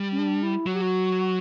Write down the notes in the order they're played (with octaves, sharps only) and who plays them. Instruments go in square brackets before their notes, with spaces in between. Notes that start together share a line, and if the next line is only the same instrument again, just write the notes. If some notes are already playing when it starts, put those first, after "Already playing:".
Already playing: [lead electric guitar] G3
[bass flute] C#4
D4
E4
[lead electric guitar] F#3 [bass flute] F#4
[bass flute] G4
F#4